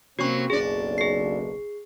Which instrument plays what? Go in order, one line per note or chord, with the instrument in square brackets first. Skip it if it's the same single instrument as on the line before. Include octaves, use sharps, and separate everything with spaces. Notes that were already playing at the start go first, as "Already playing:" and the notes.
[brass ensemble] C3 A#3 C4 [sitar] F#3 C#4 [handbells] F#4 C#6
[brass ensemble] F#1 B1 [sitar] D4 D5 [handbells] G#4
[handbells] G#4 C7